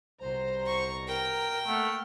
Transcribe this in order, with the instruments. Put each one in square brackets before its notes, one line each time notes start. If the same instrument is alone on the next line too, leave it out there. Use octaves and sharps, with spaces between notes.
[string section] C2 B2 A#5 [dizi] C5
[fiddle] C#6
[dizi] A#4 [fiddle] G5
[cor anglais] A3 [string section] A#3 F6 [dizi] F#5